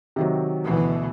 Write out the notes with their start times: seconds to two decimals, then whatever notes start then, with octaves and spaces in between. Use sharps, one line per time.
0.16 C3 D#3 F#3
0.63 D2 B2 E3